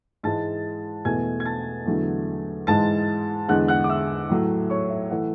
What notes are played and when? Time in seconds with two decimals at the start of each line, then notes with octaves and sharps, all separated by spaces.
0.23 G#2 E3 G#3 A5 A6
1.05 E2 B2 A3 G#5 G#6
1.40 G#6
1.45 A5 A6
1.86 E2 D3 F#3 A3
2.67 G#2 E3 G#3 A5 A6
3.48 E2 D3 G#3 F#5 F#6
3.68 F#5 F#6
3.84 D6
3.89 E5 E6
4.29 A2 F#3 A3
4.70 C#5 C#6
4.90 E5
5.10 E3 A3 F#5